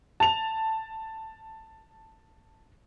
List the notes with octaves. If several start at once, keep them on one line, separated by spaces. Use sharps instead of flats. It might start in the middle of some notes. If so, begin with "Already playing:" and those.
A5 F7